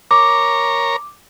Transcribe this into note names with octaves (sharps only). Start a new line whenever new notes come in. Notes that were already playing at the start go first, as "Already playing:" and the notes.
A#4 C#5 A#5 D6